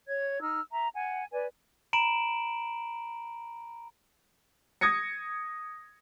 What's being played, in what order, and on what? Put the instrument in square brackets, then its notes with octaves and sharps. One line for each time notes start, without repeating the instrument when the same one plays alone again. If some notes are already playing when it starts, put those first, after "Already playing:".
[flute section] C#5 G#6
D#4 E6 F6
E5 A#5
F#5 G#5
B4 D5 G#5
[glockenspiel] A#5 B5 D7 E7 F#7
[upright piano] D#6 G#6 A#6 C#7